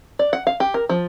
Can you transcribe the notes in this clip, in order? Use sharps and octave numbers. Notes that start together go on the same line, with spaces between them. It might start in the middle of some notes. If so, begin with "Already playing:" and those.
D5
F#5
F5
G4
A#4
F3